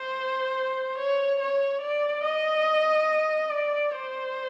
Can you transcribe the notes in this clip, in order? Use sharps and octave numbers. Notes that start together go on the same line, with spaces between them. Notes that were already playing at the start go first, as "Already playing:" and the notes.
Already playing: C5
C#5
C#5
D5
D#5
D5
C5